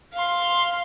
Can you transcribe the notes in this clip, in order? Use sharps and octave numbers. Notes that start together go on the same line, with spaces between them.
F5 C6